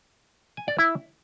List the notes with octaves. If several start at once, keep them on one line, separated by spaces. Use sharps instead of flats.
G#5
D5
E4